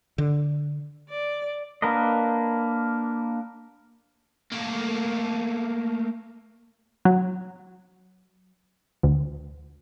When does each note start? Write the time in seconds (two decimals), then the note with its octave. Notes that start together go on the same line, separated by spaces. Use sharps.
0.18 D3
1.09 D5
1.82 A#3 D4 A#4 B4 D#5
4.52 A3 A#3
7.05 F#3
9.03 D2